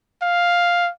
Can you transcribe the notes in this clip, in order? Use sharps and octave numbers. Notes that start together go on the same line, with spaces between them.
F5